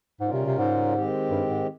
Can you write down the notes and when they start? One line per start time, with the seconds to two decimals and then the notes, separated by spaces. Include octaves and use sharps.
0.21 G#2 C#3 G3 C#4 F4 A#4
0.33 C3
0.46 C3
0.58 G#2
0.94 D#3 G#3 C4 G4
1.30 G2
1.49 G#2